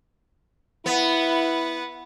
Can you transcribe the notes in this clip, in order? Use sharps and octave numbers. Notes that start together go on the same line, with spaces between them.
B3 E4 B4 F#5